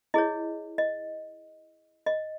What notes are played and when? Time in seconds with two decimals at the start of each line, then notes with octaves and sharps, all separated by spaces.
0.14 E4 G#4 C#5 D#5
0.78 D#5
2.06 D#5